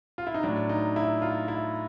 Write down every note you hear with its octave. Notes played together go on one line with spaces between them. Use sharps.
F4
E4
D#4
A2 F#3 D4
D#4
E4
F4
E4